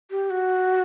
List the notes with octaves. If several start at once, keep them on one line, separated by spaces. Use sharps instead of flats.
G4
F#4